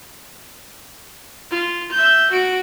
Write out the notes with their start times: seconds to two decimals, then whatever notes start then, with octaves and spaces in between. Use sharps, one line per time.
1.51 F4
1.92 E5 G6
2.31 F#4 D7